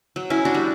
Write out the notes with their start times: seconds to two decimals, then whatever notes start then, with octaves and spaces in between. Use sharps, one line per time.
0.16 F#3
0.30 C#4 E4
0.45 D4 F#4
0.54 G3